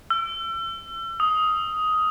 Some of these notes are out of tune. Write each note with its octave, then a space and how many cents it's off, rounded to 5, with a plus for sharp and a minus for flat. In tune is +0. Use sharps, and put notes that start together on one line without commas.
E6 +35
D#6 +10